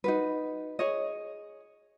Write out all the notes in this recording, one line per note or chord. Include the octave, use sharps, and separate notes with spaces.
D#4 F#4 B4
G#4 C#5 D#5